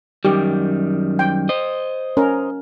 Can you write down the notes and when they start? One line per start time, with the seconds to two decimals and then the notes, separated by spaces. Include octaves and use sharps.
0.25 F#2 D#3 G3 G4
1.19 G5
1.49 C5 D#5
2.17 C#4 A#4